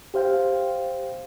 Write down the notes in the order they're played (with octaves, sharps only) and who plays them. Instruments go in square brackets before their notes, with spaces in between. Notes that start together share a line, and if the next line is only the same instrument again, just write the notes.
[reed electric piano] G4 C5 F5 G5